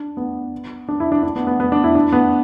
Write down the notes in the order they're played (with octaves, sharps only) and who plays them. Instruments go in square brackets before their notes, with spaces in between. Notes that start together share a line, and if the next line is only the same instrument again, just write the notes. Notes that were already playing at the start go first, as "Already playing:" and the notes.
Already playing: [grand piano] D4
B3
D4
E4
D4
D4
B3
B3
B3
D4
E4
D4
B3